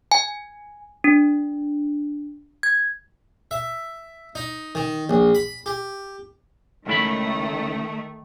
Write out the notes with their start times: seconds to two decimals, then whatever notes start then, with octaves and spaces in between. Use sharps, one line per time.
0.11 G#5
1.04 D4
2.63 G#6
3.51 E5
4.35 D#4
4.75 D#3
5.09 A#1
5.35 B5
5.66 G4
6.87 C#2 D#3 A3 E4 B5